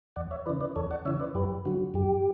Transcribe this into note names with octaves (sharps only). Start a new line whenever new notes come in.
E2 D5 F#5
C#5 E5
C#3 E3 B4 D5
B4 D5
E2 A4 C#5
D5 F#5
C#3 E3 C#5 E5
B4 D5
F#2 G4 B4
D3 F#3 F#4
F#2 G4